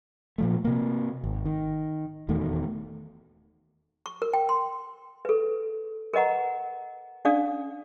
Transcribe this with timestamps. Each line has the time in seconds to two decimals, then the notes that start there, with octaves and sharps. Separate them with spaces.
0.38 A#2 F3 A3
0.65 C3 A#3
1.24 G#1
1.45 D#3
2.28 D#1 E2 D#3 A3
4.06 C#6
4.22 A#4
4.33 G5
4.49 C6
5.25 A4 B4
6.14 A#4 B4 D#5 F#5 A#5
7.25 C#4 D4 D5 F5 D#6